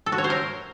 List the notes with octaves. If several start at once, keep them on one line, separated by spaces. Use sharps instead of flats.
A4
F#4
C#5
C5
A#4